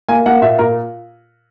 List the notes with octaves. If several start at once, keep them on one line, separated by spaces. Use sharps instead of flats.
A#3 G#5
A#3 F#5
A#2 E5
A#2 A#4